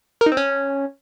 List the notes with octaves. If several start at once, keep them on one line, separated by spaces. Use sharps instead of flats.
A#4
D#4
C4
C#4